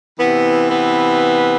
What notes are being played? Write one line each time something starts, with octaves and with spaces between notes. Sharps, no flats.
C3 E3 B3
B3